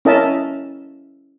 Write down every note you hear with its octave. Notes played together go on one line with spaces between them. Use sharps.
C#4 E4 A#4 D#5 E5 A5